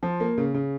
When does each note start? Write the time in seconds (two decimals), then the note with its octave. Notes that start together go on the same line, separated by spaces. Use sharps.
0.03 F3
0.20 A#3
0.38 C#3
0.54 C#3